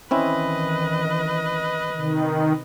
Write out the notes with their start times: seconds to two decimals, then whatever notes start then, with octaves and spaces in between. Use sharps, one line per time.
0.11 D#3 E3 C4 C#4 E4 B4 D#5
1.95 C3 D#3